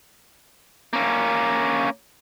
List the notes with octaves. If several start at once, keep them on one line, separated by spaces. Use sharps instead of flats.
A#3 C#4